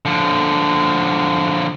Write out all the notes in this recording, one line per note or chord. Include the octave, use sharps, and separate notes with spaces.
D3 F3